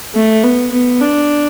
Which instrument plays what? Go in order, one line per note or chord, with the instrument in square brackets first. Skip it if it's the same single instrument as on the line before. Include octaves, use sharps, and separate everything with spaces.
[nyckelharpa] A3
B3
B3
D4